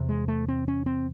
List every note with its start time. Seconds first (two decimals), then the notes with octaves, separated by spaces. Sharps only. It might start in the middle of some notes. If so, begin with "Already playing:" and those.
Already playing: E2 C3
0.09 G#3
0.28 A3
0.48 C4
0.68 C#4
0.86 C4